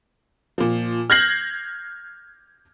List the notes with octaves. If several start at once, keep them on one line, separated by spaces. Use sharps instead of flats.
A#2 F3
F6 G6 G#6 A#6 C7 F#7